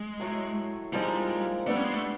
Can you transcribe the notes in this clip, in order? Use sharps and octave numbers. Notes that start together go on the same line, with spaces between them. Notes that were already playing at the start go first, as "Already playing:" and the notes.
Already playing: G#3
A2 F#3 A3
A#2 F3 G3 G#3 C4 D#4
G3 A3 B3 D4
C#4
G#3
A3